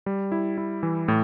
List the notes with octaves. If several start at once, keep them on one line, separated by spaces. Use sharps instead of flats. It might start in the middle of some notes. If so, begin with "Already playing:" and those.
G3
E4
E4
E3
A2